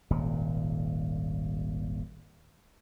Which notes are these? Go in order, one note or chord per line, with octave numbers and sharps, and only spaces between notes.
D#1 G#1 A#2